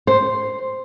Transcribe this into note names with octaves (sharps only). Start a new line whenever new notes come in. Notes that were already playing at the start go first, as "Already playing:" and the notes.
C5